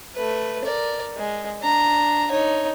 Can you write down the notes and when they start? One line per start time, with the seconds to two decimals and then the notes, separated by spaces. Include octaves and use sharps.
0.16 A3 B4
0.65 A#4 D5
1.17 G#3
1.62 D4 A#5
2.31 D#4 C#5